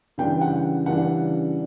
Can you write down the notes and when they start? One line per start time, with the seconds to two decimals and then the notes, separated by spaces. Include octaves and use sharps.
0.18 C#3 E3 G3 D4 G5
0.41 F#5
0.86 C#3 E3 G3 D4 F#5